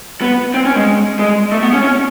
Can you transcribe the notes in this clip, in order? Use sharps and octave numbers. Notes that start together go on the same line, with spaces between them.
B3
C4
C#4
G#3
G#3
A3
B3
C#4
C#4